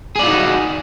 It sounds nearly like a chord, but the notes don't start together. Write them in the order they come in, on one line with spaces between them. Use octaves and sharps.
G#4 D5 F4 D#4 F#4